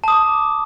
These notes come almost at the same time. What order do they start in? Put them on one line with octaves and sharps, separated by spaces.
A5 D#6 D6